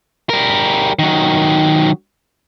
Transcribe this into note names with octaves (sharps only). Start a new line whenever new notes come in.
G3 A#4
D#3 F#3